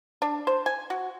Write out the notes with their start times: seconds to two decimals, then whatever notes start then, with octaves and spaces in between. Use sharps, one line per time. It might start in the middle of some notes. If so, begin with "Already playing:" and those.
0.22 D4
0.47 C5
0.66 G#5
0.90 F#4